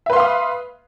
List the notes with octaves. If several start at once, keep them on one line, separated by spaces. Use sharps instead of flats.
B4 E5 F5 C6 D#6